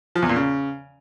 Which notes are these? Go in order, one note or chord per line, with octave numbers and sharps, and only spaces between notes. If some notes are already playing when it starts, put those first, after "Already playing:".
F3
E2
A#2
C#3